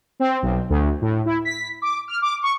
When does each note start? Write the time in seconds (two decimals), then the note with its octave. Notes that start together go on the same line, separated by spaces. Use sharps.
0.20 C4
0.42 B1
0.70 D2
1.01 A2
1.26 E4
1.45 B6
1.82 D6
2.08 F6
2.22 D6
2.43 C#6